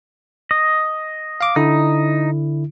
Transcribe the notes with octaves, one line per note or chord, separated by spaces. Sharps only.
D#5
F5 D6
D3 D#4 E4